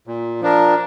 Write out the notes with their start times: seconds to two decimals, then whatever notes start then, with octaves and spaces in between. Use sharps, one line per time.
0.07 A#2
0.41 F3 D4 A#4